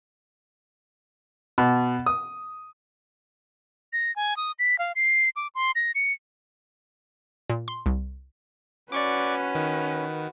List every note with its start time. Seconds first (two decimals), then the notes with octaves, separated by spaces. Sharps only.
1.58 B2
2.06 D#6
3.93 A#6
4.16 G#5
4.37 D#6
4.59 B6
4.79 F5
4.96 C7
5.36 D6
5.55 C6
5.75 A#6
5.95 C#7
7.50 A#2
7.68 C6
7.86 C2
8.92 C#4 F#4 B4 D5 C#6 D6
9.55 D#3